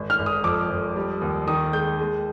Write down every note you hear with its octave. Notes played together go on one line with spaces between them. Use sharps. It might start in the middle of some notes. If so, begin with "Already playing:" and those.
Already playing: G#1
F6
G#1
D#6
F2 D6
F2
G3
D#2
D#3 D#6
G#3 G6
G#3